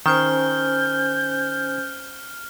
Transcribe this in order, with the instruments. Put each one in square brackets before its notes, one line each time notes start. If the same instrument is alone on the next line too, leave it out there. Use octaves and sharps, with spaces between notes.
[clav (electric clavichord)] D#3 [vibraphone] C#4 C5 G#5 [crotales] F6 [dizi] G6